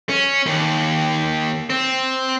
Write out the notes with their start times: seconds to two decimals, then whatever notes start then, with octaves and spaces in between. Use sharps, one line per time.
0.09 C#4
0.46 D#2
1.70 C4